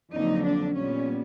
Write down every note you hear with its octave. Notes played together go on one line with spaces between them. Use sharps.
F2 D3 F#3 A#3 D#4
D4
A#2 G3 B3 C#4